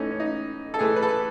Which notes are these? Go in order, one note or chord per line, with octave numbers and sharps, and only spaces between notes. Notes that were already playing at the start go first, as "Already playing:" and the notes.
Already playing: A2 E3 A3 C#4 D#4
C#4
D#4
A4
A2 E3 A3 G#4
B4
A4